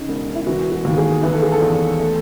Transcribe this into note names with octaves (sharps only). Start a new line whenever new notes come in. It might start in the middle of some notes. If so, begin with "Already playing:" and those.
Already playing: C#3 D#4
E1
E4
E3 F#4
F#4
D#2
G#4
E3 B4
A4
G#4
A4
E2
A3